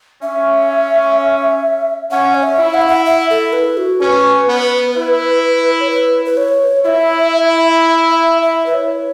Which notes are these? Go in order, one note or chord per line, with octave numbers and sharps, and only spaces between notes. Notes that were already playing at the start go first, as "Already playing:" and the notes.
C#4 E5
C#4 F#5
C#5
E5
E4
F#5
E5
F#5
E5
A4
B4
F#4
C#4 B4
B3
E4
C#5
B4
B4
C#5
E4 E5
E5
E5
B4
C#5